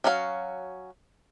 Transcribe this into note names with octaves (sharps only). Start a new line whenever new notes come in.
F#3 C#4 F#4 A#4 F5